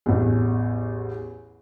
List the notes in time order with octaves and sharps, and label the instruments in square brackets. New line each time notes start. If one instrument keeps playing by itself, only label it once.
[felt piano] A1 E2